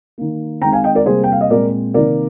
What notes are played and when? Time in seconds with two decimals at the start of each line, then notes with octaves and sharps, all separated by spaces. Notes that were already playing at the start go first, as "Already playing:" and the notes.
0.18 D#3 A#3
0.62 D#3 G#3 C4 G5 A#5
0.72 F5 G#5
0.84 D#5 G5
0.95 A#4 D5
1.06 C3 G3 A#3 G#4 C5
1.24 G5
1.32 F5
1.41 D#5
1.50 A#2 G#3 C4 A#4 D5
1.94 C3 D#3 A#3 A#4 D5